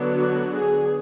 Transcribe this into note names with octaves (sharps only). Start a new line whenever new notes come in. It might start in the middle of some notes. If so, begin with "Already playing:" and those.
Already playing: D3 F#3 B3 D4
F#4
G#4